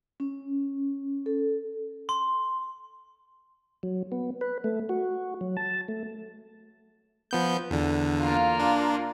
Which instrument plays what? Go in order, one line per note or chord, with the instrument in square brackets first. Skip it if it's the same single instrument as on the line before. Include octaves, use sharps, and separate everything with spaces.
[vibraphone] C#4
A4
[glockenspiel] C6
[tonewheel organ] F#3
B3
B4
A3
F#4
F#3
A5
A3
[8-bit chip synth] F3 B3 G6
E2 D3
[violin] A#3 F4
[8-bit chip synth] D4